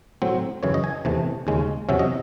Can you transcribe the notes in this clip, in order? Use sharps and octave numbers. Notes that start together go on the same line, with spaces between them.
A2 F#3 C4
F#2 C#3 E3 C#5
D#5
G#5
E2 C3 E3 A3
D#2 C#3 G#3 C#4
E2 C3 F#3 C#4 E5
D#5